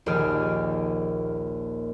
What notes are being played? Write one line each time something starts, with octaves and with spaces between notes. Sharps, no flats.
A#1 D#2 D#3 G4 G#4 F6